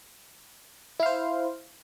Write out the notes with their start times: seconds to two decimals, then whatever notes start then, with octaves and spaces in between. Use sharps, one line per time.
1.00 E4
1.03 F5
1.06 C5